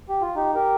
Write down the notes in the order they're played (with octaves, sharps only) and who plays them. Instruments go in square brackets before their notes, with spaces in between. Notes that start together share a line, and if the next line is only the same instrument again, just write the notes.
[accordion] G4
F4
D#4 G4
G4 A#4